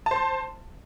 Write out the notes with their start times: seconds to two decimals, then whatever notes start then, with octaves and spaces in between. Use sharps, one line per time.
0.06 A5
0.11 C5
0.16 C6